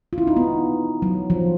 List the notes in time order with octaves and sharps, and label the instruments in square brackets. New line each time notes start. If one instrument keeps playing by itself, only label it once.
[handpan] F4
E4
D#4
B3
F#3
F3